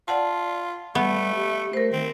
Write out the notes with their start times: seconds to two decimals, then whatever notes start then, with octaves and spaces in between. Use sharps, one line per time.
0.08 F4 D5 F#5 A5
0.95 G3 A3 B3
1.35 G4
1.73 A3 A#4 C5
1.93 D#3 C4